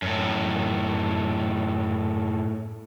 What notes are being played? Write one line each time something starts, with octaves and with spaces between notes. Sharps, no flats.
F#2 A2